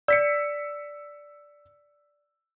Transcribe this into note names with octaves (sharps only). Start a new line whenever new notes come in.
D5 E6 B6 C#7